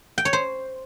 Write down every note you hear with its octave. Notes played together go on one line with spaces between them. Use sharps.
G5
C#5
C5